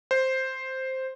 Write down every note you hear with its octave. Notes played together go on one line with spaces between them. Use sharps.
C5